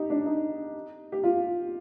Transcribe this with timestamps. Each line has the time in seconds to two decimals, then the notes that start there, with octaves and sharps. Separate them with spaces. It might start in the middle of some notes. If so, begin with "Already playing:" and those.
Already playing: D#4 G4
0.10 D4
0.26 D#4
1.12 G4
1.24 F4